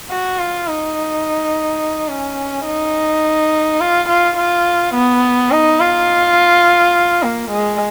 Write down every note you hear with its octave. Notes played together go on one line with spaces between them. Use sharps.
F#4
F4
D#4
C#4
D#4
F4
F4
F4
B3
D#4
F4
A#3
G#3